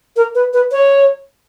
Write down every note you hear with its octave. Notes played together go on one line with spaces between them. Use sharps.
A#4
B4
B4
C#5